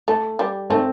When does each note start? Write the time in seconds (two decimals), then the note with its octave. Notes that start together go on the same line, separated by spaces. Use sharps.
0.08 A3 A4
0.39 G3
0.70 A3 C4